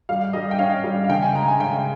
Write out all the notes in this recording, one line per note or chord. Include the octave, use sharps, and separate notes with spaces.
G3 F5
G3 D#5
G5
C#4 F5
G3
F5
C#3 G5
G#5
G#3 A#5
G#5
C#3 G5